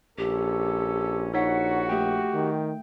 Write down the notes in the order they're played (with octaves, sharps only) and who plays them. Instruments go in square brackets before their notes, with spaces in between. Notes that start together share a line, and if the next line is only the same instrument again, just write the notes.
[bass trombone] A#1 [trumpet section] C#4 A4 [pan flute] G4
[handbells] D#4 C#5 B6 [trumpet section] F#4 [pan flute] F#5
[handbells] A3 G5 [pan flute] G4
[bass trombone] D#3